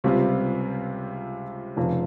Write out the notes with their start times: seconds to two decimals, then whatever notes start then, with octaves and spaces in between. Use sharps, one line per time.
0.04 C#2 C3 G3 C4 F4
1.77 F1 F2 C#3